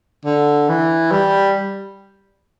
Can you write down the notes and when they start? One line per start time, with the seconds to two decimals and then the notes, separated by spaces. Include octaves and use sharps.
0.25 D3
0.69 E3
1.11 G3